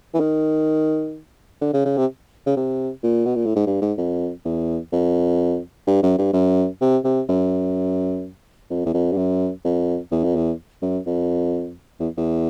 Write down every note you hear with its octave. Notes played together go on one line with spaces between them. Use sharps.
E3
D#3
D3
C#3
C#3
C3
C#3
C3
A#2
B2
A#2
A2
G#2
G2
G#2
F2
E2
F2
G2
F#2
G2
F#2
C3
C3
F#2
F2
E2
F2
G2
F#2
F2
E2
F2
E2
F#2
F2
E2
E2